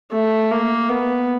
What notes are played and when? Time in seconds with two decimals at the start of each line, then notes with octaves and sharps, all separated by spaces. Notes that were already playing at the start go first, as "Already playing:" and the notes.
0.12 A3
0.51 A#3
0.89 B3